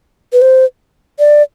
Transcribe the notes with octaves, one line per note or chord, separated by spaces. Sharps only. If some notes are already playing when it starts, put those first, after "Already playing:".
B4
C5
D5